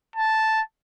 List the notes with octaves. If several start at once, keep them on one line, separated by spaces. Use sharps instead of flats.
A5